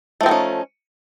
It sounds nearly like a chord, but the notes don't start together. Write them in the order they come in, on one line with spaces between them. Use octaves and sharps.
A3 F3 C4 D#4 C#4